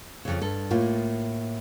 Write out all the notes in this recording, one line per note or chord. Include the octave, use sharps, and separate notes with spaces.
F2 C#3
G2 A4
A2 A#3 F4